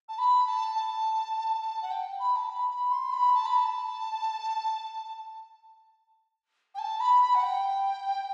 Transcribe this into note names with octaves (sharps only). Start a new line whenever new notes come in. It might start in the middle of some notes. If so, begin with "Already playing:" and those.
A5
B5
A5
A5
A5
F#5
G5
B5
A5
B5
B5
C6
B5
A5
B5
A5
G5
A5
B5
B5
F#5
G5